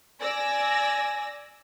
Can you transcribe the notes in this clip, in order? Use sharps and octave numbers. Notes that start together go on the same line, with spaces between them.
D5 G#5 E6 A#6